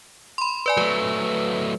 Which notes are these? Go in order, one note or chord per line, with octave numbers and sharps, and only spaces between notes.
B5 C6
B4 D5 G#5
F#3 A3 B4